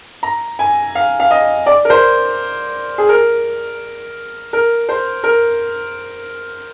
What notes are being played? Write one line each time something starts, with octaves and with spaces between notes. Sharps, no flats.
A#5
G#5
F5
F5
D#5
D5
A#4
C5
G#4
A#4
A#4
C5
A#4